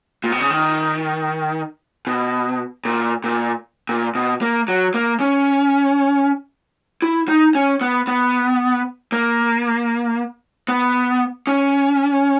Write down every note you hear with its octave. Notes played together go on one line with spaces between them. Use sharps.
A#2
B2
C#3
D#3
B2
A#2
A#2
A#2
B2
A#3
F#3
A#3
C#4
E4
D#4
C#4
B3
B3
A#3
B3
C#4